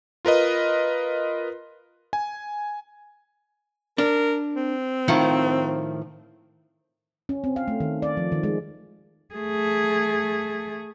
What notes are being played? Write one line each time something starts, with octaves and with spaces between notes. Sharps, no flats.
F4 A#4 B4 D#5
G#5
D4 A#4
C4
A2 D#3 F3
C#4
C4
F5
A3
D#3
D5
F3
D#3
G#3
A3 G#4